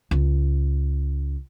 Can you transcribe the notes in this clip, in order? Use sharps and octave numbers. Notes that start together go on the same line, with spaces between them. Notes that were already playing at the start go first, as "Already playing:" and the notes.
C#2